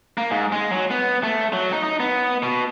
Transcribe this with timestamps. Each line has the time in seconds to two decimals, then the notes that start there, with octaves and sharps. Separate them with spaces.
0.18 A#3
0.31 G#2
0.52 G#3
0.71 F#3
0.91 B3
1.23 A3
1.53 F#3
1.72 D#4
1.84 D#4
2.00 B3
2.43 B2